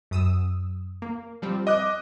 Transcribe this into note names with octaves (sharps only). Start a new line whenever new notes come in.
F#2 D#6 E6
A#3
F3 G3 C4
D#5 D6 F#6